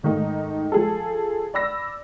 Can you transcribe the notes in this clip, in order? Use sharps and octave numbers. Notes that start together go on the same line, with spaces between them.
G#2 D#3 A3 D#4
F3 G#4 A4
D5 B5 E6 A#6